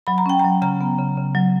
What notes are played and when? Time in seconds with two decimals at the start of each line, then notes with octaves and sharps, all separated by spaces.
0.07 F#3 B5
0.18 A#5
0.26 C#4 G5
0.39 F#3 A#5
0.62 C#3 A#5
0.81 B3
0.99 C#3
1.17 C#3
1.35 F#3